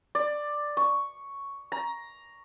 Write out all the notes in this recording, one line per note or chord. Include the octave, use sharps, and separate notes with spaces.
D5
C#6
A#5